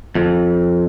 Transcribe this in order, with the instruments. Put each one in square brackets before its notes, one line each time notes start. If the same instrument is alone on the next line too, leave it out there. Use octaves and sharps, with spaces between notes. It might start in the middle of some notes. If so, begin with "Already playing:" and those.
[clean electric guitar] F2